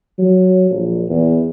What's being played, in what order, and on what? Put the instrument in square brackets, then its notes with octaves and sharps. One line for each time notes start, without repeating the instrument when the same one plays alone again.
[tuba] F#3
A#1
E2